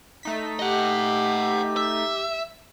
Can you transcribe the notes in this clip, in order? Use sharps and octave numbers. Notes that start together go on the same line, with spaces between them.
A3 D#4 B6
G4 D#5 F#5
E5